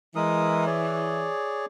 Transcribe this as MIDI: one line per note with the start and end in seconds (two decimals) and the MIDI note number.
0.16 1.29 52
0.16 0.66 56
0.16 0.66 70
0.16 0.66 87
0.67 1.66 68
0.67 1.66 73
0.67 1.66 74